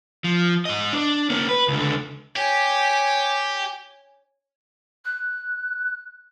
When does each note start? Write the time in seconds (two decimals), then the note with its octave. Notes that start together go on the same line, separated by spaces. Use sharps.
0.24 F3
0.65 G#2 D#5
0.93 D4
1.30 A#3 C#4
1.49 B4
1.68 C#2 D3
2.36 G4 C#5 G#5
5.05 F#6